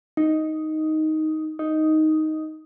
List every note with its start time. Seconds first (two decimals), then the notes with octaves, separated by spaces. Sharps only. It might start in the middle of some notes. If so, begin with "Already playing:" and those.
0.17 D#4
1.59 D#4